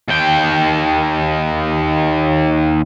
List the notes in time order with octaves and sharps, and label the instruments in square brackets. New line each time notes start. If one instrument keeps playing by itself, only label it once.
[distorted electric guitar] D#2 G5